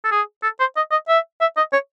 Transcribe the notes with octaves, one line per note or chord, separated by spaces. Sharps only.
A4
G#4
A4
C5
D#5
D#5
E5
E5
D#5
C#5